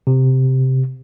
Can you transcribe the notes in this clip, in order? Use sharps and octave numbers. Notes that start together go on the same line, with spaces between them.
C3